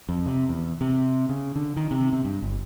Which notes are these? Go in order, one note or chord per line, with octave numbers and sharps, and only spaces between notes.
F2
C3
E2
C3
C#3
D3
D#3
C3
C3
G2
G1